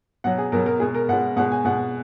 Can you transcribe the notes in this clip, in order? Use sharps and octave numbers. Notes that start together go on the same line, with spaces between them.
B2 F#3 F#5
G#4
B2 F#3 A#4
A#4
B2 G#3 G#4
A#4
B2 G#3 F#5
B2 G#3 F#5
G#5
B2 G#3 F#5